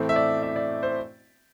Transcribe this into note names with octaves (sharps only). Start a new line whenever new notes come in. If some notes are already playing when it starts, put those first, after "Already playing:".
Already playing: A2 E3 A3 C4
E5
D5
E5
D5
C5